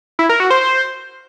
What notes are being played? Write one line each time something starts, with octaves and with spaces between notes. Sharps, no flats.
E4
A#4
F#4
C5
C5